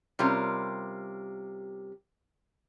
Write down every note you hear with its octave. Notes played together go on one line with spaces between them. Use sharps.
C3 G3 C#4 F4 A#4